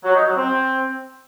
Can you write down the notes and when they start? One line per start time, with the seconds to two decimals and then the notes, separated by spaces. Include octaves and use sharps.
0.04 F#3
0.15 D#4
0.26 F#3
0.37 C4